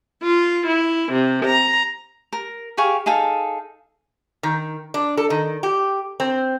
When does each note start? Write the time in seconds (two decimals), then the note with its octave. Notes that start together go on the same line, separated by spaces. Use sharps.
0.23 F4
0.67 E4
1.11 C3
1.46 A#5
2.33 A#4
2.77 G4 G#4 F5 C#6
3.06 D#4 G#4 A4 F5
4.43 D#3
4.94 D4
5.17 A4
5.30 D#3
5.63 G4
6.20 C4